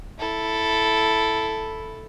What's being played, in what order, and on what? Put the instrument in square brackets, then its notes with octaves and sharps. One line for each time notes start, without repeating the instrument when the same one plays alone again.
[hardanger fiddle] E4 A4